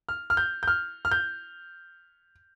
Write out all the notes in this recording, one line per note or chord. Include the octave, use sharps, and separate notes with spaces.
F6
F6
G6
G6
F6
F6
G6